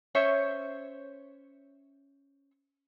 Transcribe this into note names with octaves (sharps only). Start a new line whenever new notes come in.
C#4 C5 C#5 E5